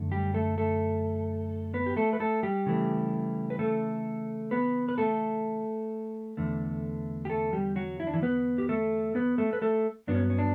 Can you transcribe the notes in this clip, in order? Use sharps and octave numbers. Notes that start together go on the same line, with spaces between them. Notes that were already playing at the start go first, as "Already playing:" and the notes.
Already playing: F#2 D3 A3
G3 G4
A3 A4
A3 A4
B3 B4
G4
A3 A4
B4
A3 A4
G3 G4
C#3 E3 A3
B4
A3 A4
B3 B4
B4
A3 A4
E2 D3 A3
G4
A3 A4
G3 G4
F#3 F#4
E4
D4
E3 E4
B3 B4
G4
A3 A4
B3 B4
A3 A4
B4
A3 A4
G2 F#3 B3 D4
C#4
C#4
D4